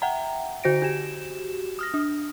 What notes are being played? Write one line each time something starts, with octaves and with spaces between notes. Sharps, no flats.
E5 F#5 G5 A#5
D3 F#4 C5 A#6 D7
F#4 G4 E7
D#6 F6 A#6
D4